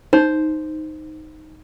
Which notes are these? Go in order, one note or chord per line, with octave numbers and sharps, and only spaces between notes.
D#4 C5